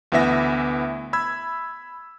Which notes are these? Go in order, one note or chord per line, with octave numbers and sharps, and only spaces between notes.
D2 E3 B3 E5 A#6
B5 E6 G#6